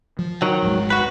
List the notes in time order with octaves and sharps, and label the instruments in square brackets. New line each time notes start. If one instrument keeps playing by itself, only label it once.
[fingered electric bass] F3
[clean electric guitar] D#3 F#3
[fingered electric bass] D#1 G#1 G#3
[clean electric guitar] F#4 B4